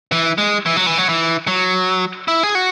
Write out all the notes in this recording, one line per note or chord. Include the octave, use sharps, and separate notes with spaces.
E3
G#3
E3
F#3
E3
F#3
E3
F#3
E4
G#4
F#4